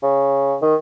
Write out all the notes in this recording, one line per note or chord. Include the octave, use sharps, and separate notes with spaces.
C#3
D#3